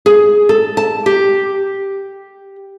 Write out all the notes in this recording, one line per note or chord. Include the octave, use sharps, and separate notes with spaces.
G#4
A4
A5
G4